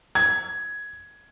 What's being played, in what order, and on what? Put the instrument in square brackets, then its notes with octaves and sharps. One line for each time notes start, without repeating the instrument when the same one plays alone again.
[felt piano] G#6